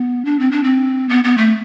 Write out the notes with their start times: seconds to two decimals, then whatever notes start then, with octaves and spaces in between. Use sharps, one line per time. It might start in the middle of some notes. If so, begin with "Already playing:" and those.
Already playing: B3
0.25 D4
0.39 C4
0.51 D4
0.64 C4
1.09 B3
1.24 B3
1.38 A3